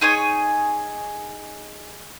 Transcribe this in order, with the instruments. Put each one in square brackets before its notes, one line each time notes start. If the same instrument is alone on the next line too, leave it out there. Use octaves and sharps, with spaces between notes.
[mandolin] D#4 G#4 C#5 G#5